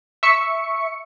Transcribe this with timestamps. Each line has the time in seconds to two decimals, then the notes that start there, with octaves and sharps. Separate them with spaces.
0.23 E5 C#6 C#7